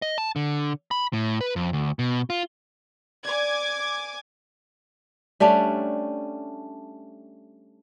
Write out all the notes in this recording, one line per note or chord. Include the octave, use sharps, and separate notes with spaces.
D#5
A5
D3
B5
A2
B4
F2
D2
B2
F4
D5 G#5 D6 G#6
G3 A3 C#4 D4